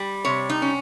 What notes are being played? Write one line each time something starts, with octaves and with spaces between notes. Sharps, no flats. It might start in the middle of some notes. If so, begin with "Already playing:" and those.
Already playing: G3
C3 C#5
D#4
C#4